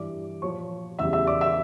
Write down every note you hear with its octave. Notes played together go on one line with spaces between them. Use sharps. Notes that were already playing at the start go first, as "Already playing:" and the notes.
Already playing: G2 E3 G3 D5 D6
A#2 F3 C#5 C#6
E2 C#3 E3 G3 E5 E6
E5 E6
D5 D6
E5 E6